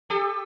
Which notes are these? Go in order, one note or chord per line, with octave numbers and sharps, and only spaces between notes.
G4 A4